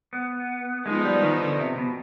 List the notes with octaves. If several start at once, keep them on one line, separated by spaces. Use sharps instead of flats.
B3
F3 G#3 B3 D#4
G3
D#3
D3
C3
B2